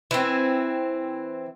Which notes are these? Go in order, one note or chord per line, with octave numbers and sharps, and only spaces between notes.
E3 C4